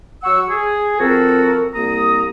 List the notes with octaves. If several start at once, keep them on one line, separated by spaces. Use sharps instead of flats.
F#3 F#5 C#6 E6
G#4
F3 C4 F#4 A4 A#4
C2 A#3 A#5 D#6